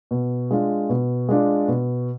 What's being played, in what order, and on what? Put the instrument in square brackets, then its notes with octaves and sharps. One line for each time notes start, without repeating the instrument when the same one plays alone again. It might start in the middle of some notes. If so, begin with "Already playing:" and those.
[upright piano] B2
G#3 D4 F4
B2
G#3 D4 F4
B2